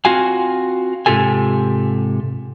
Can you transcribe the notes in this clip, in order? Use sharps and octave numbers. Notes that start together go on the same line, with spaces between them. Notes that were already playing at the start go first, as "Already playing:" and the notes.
C4 F4 F#4 F5 G#5
G#2 C3 F4 G4 A4 G#5